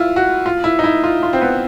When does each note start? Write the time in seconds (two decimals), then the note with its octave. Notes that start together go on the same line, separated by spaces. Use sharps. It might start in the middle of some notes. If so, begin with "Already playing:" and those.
Already playing: E4 F4
0.16 F#4
0.46 F4
0.64 E4
0.79 D#4
0.84 E4
1.04 F4
1.23 F4
1.33 C4
1.41 B3